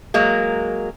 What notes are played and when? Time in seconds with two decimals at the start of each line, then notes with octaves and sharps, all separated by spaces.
0.14 F#3 G#3 A#3